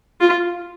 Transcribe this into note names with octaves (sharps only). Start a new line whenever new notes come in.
F4